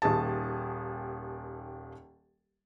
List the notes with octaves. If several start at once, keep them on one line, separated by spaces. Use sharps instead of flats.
D#1 D#2 G#4 A5